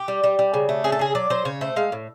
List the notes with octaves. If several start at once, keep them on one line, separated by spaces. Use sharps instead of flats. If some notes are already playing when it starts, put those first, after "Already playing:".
Already playing: G4
G3
G3
G3
C#3
A3
C#3 G#4
A4
C#3 G#4
F#3 D5
F#3 C5
C#3 C#5
A3 C5
G#3 F5
A2